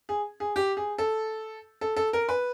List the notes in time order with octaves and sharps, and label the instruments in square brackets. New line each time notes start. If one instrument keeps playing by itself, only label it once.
[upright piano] G#4
G#4
G4
G#4
A4
A4
A4
A#4
B4